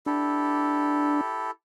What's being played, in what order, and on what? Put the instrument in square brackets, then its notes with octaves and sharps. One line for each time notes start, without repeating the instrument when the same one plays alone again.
[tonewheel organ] D4 [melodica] E4 G4 A4